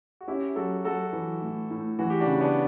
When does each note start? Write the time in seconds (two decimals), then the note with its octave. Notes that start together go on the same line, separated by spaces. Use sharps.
0.21 F#4
0.28 C#4 E4 G4
0.56 F#3 F#4 A4
0.85 F#3 F#4 A4
1.13 E3
1.42 A2
1.70 A2
1.99 E3 F#4
2.10 G4
2.20 D4 F#4
2.26 C#3
2.40 B3 D4